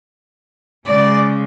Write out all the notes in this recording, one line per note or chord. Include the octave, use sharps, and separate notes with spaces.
C#3 G#3 D5